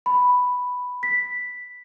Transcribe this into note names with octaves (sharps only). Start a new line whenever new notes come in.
B5
B6